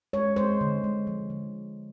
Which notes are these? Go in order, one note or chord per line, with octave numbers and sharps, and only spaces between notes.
G#3 C#5
G#3 C5
D3
G#3
F3
D3